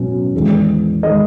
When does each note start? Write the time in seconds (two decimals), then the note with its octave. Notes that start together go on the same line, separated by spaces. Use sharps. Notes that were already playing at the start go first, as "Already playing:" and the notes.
Already playing: B2 F#3 C#4
0.33 E2 D#3 G#3
1.03 D#3 G#3 D#5